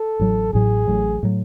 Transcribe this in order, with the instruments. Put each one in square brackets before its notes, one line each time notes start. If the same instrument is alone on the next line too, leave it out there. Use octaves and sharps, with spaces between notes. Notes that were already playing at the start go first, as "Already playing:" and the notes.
Already playing: [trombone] A4
[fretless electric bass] A1 A2 F#3
[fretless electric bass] A1 A2 F#3 [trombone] G#4
[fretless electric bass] A1 A2 F#3
A2 F#3